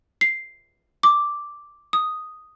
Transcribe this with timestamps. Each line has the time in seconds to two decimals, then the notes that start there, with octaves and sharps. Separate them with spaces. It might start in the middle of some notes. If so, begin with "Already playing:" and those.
0.21 C7
1.03 D6
1.93 D#6